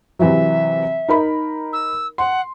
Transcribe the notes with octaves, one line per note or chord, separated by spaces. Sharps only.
C3 E3 F#3 E5
D#4 A#4 B5
E6
F#5 C6